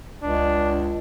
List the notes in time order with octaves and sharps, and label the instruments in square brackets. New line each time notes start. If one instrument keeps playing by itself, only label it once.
[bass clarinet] C#2 [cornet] D4